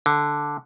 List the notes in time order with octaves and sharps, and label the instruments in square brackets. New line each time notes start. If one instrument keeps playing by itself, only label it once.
[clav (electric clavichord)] D3